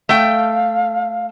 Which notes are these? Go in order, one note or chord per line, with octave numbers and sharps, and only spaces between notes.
A3 F5 G5